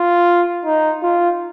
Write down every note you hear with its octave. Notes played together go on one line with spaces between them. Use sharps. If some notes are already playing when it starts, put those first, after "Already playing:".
Already playing: F4
D#4
F4